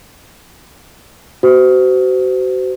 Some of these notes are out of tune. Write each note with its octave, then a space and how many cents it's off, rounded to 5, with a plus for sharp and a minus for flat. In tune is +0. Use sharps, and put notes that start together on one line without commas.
F#4 +35 C5 -35